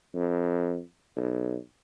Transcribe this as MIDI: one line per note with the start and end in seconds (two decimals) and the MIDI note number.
0.14 0.79 41
1.16 1.56 35